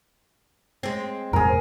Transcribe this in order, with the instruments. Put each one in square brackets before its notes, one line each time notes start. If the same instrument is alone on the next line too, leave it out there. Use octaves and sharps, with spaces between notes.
[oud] G#3 C4
[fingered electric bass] E1 F#2 A2 [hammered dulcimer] G#4 A#4